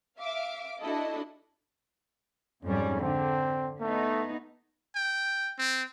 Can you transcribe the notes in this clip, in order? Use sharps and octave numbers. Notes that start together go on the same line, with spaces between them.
E5 F5 D6
D4 E4 F#4 A4 D#5
F2 G#2 G3 C#4
D3 C4
A3 B3 D#4
G5
C4